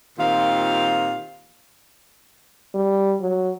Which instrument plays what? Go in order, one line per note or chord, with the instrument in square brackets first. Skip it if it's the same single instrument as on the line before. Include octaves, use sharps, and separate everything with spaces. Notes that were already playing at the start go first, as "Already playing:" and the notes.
[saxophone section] A#2 D#3 C4 F4 G4 F5
[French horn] G3
F#3